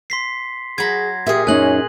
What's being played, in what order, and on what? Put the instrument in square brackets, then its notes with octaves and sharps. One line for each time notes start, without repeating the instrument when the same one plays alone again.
[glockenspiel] C6 B6 C7
[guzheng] F#3 B5 [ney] G#4 [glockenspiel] G#6 A#6
[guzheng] A#2 G#4 [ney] G4 [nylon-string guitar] E5
[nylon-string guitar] F#2 C#4 D#4 [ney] C#5 [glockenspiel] G#5 F#6 F#7